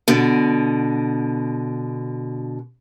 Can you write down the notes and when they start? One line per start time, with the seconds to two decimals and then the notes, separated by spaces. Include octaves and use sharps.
0.08 B2 D3